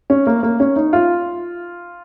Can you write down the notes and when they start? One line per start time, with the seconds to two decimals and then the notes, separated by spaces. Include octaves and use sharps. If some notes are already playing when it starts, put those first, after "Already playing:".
0.10 C#4
0.27 A#3
0.43 A#3
0.60 C#4
0.76 D#4
0.93 F4